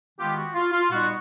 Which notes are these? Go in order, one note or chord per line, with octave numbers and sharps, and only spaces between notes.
D#3 G#3 B3 F4 G4
F#4
F4
F4
A#2 G3 B3 D#4 F#4